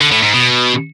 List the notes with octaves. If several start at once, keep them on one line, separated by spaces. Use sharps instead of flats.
D3
A2
G#2
B2